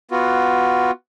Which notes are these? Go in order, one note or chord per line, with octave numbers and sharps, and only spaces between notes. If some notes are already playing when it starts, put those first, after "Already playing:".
B3 F4 F#4